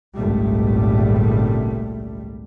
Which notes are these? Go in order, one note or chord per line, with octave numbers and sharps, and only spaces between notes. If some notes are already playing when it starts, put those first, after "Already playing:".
G#1 C#2 A#2 G3 A3